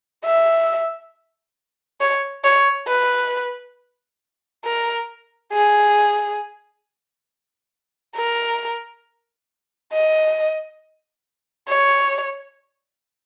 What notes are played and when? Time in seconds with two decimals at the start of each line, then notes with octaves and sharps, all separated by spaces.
0.25 E5
2.01 C#5
2.44 C#5
2.88 B4
4.65 A#4
5.53 G#4
8.16 A#4
9.93 D#5
11.69 C#5